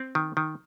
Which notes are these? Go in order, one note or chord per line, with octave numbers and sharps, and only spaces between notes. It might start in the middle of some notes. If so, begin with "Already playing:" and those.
Already playing: C4
D#3
D#3